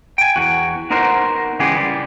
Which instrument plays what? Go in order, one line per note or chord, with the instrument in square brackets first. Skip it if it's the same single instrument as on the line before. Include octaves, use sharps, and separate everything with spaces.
[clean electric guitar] G5 G#5
E2 F#4
B3 D#4 F#4 A#4 C5
C#3 E3 G#3 B3 G4 G#4
G3